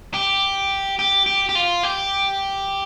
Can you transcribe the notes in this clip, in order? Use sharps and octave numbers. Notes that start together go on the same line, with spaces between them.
G4
G4
G4
G4
F4
G4